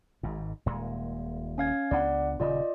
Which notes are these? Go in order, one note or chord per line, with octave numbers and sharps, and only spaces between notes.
G#1 G#2
D#1 A#2 G#3
C#4 F5 G#6
C#2 B3 D4 D5 F#5
D#1 C#3 F4 D5 D#5